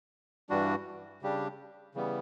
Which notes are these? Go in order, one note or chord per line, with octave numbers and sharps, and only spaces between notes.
G2 E3 G3 D4 F#4
C#3 G3 D4 G4
C#3 E3 G3 B3